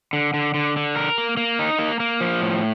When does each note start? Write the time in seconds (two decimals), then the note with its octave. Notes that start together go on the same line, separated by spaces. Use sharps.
0.13 D3
0.34 D3
0.54 D3
0.76 D3
0.96 A#4
1.18 A#3
1.37 A#3
1.59 D#4
1.79 A#3
2.00 A#3
2.21 F3
2.42 A2